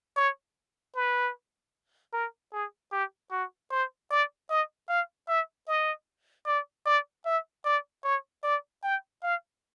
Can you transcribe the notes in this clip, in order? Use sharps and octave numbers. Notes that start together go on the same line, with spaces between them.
C#5
B4
A#4
G#4
G4
F#4
C5
D5
D#5
F5
E5
D#5
D5
D5
E5
D5
C#5
D5
G5
F5